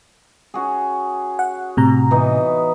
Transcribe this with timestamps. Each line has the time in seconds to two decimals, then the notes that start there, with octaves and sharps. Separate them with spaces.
0.54 C#4 F#4 G#4
1.39 F#5
1.77 A2 C3 A#5
2.11 E3 B3 D#4